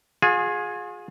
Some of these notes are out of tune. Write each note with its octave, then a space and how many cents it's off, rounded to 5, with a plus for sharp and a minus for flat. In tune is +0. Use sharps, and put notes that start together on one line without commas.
F4 +40 G#4 +0